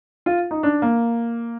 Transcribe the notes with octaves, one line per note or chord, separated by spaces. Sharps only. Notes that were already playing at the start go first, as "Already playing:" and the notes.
F4
D#4
D4
A#3